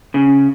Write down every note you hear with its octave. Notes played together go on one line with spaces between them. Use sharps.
C#3